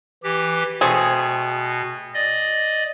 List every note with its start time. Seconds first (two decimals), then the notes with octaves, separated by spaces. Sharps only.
0.23 E3 G4
0.81 B2 A3 C4 G#4
2.14 D5 D#5